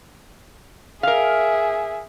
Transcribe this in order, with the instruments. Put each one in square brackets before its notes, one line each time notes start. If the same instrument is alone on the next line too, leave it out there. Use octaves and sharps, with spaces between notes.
[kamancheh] G#4 E5 [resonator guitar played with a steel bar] A#4 F5